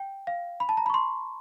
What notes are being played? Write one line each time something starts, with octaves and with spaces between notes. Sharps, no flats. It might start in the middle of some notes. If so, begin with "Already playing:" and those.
Already playing: G5
F5
B5
A5
A#5
B5
C#6
C6